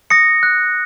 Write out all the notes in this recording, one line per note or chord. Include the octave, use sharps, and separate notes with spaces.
D#6 A#6 C#7
F#6